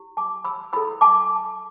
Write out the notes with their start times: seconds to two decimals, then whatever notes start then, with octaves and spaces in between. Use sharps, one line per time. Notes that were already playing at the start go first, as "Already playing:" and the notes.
Already playing: E4 G4
0.17 A5 D6
0.44 B5 E6
0.73 E4 A4 B5 E6
1.01 A5 D6